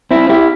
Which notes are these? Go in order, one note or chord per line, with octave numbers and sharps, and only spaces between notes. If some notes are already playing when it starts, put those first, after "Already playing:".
C4 E4
E4 G4